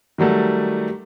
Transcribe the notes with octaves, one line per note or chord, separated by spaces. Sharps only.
D#3 F#3 G3 A3